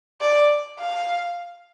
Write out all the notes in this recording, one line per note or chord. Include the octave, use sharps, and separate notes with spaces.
D5
F5